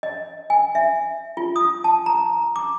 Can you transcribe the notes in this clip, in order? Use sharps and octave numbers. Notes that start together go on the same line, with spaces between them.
D#5
G#5
E5
F4
D#6
A5
A#5
D6